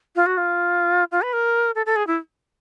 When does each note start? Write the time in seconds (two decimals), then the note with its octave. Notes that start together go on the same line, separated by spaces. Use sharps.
0.16 F4
0.26 F#4
0.37 F4
1.12 F4
1.22 B4
1.33 A#4
1.75 A4
1.86 A4
1.96 G#4
2.07 E4